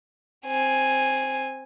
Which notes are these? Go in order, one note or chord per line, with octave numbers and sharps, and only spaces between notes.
C4 G#5